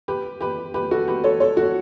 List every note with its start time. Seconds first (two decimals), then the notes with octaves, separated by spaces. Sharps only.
0.08 G4 B4
0.41 G4 B4
0.74 G4 B4
0.91 F#4 A4
1.08 G4 B4
1.24 A4 C#5
1.40 A4 C#5
1.57 F#4 A4